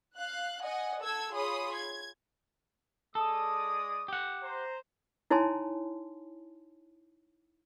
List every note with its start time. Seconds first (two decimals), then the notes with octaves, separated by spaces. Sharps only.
0.15 F5 F#6
0.63 D#5 F#5 G#5
1.00 A4 E6 G#6
1.32 F4 G#4 C#5 B5 C6 D#6
1.75 G#6
3.15 G#3 A4 D5 D#6
4.08 G4 F#5
4.43 C5 A#5
5.30 D#4 E4 C#5 G#5 A5 C6